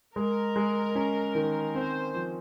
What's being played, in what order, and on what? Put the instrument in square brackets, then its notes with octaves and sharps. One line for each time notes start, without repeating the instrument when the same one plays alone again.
[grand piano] G#3 [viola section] A#4
[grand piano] G#3
C#4
D#3
[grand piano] C4 [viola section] C5
[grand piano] F3